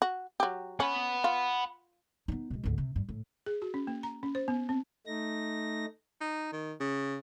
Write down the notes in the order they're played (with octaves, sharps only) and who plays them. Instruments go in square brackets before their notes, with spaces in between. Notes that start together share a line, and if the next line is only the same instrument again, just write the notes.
[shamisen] F#4
F#3 G4
[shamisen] C#4 [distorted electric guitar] F#5 B5
[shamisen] F4
[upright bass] B3 D#4
B2 G#3
G#1 D2
C3
G2
A2
[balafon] G#4
F#4
C#4
A#3
A#5
C#4
C5
B3
C4
[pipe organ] A3 D#4 A#6
[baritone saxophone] D#4
D#3
C#3